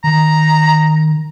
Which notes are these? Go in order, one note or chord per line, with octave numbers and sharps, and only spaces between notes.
D#3 A#5